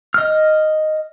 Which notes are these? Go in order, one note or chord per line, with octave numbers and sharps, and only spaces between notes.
D#5 F6